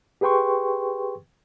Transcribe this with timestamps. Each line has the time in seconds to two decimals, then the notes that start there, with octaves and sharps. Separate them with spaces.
0.21 G4 G#4 B4 G5 C6 C#6